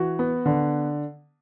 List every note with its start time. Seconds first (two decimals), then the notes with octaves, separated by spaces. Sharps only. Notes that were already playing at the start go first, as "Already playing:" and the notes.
Already playing: E3 F#4
0.19 B3
0.46 D3